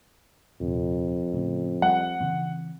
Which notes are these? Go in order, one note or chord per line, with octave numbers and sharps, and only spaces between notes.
D#1 F2 C3
A2 C#3
G3 F#5
C#3 E3 C4